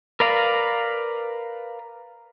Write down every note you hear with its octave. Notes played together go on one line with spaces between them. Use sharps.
A#4 B4 D5 F5 A#5